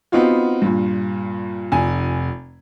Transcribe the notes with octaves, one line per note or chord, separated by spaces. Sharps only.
B3 C4 D#4 F4 F#4
G2 A#2
F1 G#5